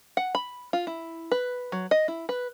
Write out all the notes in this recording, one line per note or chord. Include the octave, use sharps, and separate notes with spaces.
F#5
B5
F4
E4
B4
F#3
D#5
E4
B4